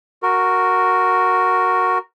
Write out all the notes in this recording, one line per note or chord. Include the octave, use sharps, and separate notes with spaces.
F#4 A#4